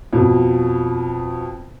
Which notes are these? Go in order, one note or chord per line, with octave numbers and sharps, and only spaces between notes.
F2 B2